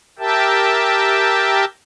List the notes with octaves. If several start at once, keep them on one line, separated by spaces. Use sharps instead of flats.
G4 A#4 E5 G5 A5